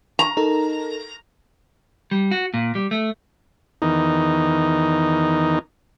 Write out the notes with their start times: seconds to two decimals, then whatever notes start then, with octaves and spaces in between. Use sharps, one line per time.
0.19 A#5
0.37 D#4 A4 A#4
2.11 G3
2.31 F#4
2.54 A#2
2.75 G3
2.91 A3
3.82 E2 D#3 D#4